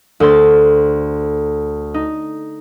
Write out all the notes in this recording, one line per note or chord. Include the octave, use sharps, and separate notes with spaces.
D2 A4 C5 C6 A6
D#4